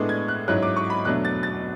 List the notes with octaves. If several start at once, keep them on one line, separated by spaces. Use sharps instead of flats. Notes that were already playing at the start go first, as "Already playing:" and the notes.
Already playing: A2 G#3 B3 D4
G#6
F#6
G#2 F#3 C#4 E4 F#6
D6
C#6
B5
E2 B2 F#3 A3 D4 F#6
A6
A6